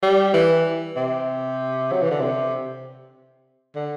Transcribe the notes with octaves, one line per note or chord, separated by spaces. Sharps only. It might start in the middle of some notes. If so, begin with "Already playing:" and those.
G3
E3
C3
F#3
E3
D3
C3
D3